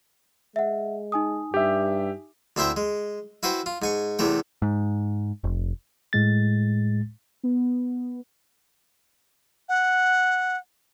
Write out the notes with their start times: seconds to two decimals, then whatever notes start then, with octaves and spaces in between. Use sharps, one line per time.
0.56 G#3 E5 F#5
1.12 D#4 G#5 D#6
1.54 G2 G4 E5
2.57 D2 C4 E4 C5 E5 G5
2.77 G#3
3.43 E4 F#4 B4 C5 G5
3.66 F4
3.82 G#2 G#5 C#6
4.19 E2 C3 E3 A3 G5
4.62 G#2
5.44 F1
6.13 A2 G#3 A6
7.43 B3
9.69 F#5